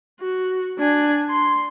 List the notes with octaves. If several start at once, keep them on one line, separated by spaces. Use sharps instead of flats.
F#4
D4 G#5
C6